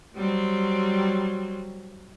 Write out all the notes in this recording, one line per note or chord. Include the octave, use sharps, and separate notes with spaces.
F#3 G3 C4